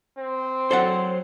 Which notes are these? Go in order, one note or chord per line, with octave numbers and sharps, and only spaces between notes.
C4
F#3 A4 C5 D5 F#5